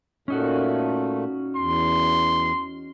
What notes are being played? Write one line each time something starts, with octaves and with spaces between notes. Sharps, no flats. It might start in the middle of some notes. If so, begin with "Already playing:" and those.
A#2 A3 C#4 D#4 F#4
E2 C6